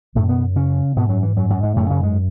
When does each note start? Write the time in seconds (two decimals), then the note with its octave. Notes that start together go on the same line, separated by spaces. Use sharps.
0.15 F#2 A2 C#3 A3
0.29 B2 B3
0.56 C#3 C#4
0.96 G#2 B2 B3
1.09 F#2 F#3
1.23 E3
1.36 F#2 F#3
1.50 F#2 F#3
1.63 G#2 G#3
1.76 F#2 A2 C#3 A3
1.90 C#3 C#4
2.03 G#2 G#3